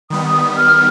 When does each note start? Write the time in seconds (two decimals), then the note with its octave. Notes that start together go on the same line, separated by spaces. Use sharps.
0.10 D#3 G3 B3 D#6
0.57 F6